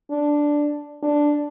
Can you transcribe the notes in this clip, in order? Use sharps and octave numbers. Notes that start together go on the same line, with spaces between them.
D4
D4